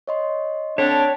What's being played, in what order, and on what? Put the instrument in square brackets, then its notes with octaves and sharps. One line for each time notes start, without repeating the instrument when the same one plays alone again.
[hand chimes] C#5 D#5 C6
[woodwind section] D3 C4 D4 [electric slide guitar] C#5 [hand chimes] B6